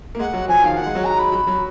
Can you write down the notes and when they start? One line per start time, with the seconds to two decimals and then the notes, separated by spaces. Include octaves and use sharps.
0.15 A#3
0.19 G#3 F#5
0.33 F#3
0.48 F3 G#5
0.62 D#3 F5
0.76 D#3 F#5
0.86 G#3
0.95 F#3
1.04 A#5
1.19 B5
1.32 F#3
1.47 F#3